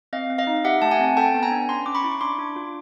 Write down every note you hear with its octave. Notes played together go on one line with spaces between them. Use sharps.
C4 D#5 F5
C4
D#5 F5
D#4
G4 E5 F#5
A3 A5
F#5 G#5
C4
A4 G5 A5
B3
G#5 A#5
D4
C#4 A#5 C6
C#4 D6
B5 C#6
E4
C#6
D4 C6 D6
D4
F4